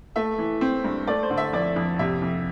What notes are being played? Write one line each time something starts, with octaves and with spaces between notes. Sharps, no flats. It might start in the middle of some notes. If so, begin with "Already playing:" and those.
A3 E5
E3
C4
G2
A3 D5
C5
D3
E5
F2 D5
F2
C3 E5
F2